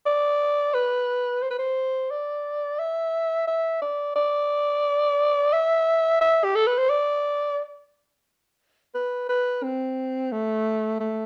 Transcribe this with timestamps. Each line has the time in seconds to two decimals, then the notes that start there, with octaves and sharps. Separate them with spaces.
0.06 D5
0.75 B4
1.43 C5
1.51 B4
1.59 C5
2.11 D5
2.79 E5
3.48 E5
3.82 D5
4.16 D5
5.53 E5
6.21 E5
6.44 G4
6.56 A4
6.67 B4
6.79 C5
6.90 D5
8.95 B4
9.29 B4
9.64 C4
10.32 A3
11.00 A3